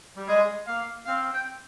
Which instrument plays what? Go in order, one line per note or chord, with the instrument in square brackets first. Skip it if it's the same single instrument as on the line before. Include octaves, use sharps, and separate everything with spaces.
[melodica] G3
[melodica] G#3 [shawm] G#4
[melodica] A#3 [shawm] F5
[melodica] C4 [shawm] F5
[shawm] G5